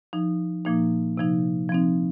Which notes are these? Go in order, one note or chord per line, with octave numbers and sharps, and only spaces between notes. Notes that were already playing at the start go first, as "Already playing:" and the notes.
F3 D#4
A#2 F3 A#3 D#4
C3 F3 D#4
F3 C4 D#4